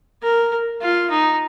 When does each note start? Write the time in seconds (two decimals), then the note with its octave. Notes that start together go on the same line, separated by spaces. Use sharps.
0.23 A#4
0.81 F4
1.10 D#4